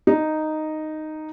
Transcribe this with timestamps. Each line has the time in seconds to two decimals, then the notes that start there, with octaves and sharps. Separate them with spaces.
0.07 D#4